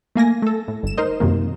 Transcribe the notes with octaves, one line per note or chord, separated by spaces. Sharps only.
A3 A#3 G#5 A#6
A3 A4
A2
G1 E7
D#4 A#4 C5 D#5
F#2 C3 D#3 A#3